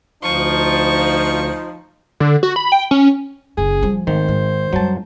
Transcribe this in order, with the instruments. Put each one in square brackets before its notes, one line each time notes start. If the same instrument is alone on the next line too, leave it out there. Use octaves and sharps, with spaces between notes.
[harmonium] D2 [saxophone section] F3 [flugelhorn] D#4 [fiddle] C#6
[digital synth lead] D3
F#4
B5
G5
C#4
[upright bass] F#1 C#4 [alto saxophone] G#4
[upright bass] F3 G3
[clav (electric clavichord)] G#1 D#3 [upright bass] A3 [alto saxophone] C5
[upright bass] G#2
[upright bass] F#2 G3 [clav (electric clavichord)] F#3 A5